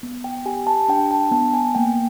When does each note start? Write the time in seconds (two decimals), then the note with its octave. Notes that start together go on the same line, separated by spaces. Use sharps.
0.03 B3
0.24 G5
0.46 G4 G#5
0.67 A5
0.88 D4 G5
1.11 A5
1.32 B3 A5
1.54 G#5
1.75 A#3 G5